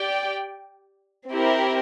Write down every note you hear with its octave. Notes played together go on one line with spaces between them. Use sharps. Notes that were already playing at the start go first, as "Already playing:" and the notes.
Already playing: G4 D5 G5
C4 E4 G4 A#4